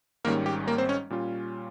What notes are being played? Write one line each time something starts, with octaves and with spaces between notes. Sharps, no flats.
G#1 G#2 D#3 G3 A#3 C#4 A#4
G4
A#3 A#4
C4 C5
C#4 C#5
A#2 G3 C#4 F4